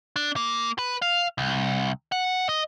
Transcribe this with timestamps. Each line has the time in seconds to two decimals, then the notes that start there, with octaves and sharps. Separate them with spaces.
0.16 D4
0.36 A#3
0.79 B4
1.02 F5
1.38 C2
2.12 F#5
2.49 D#5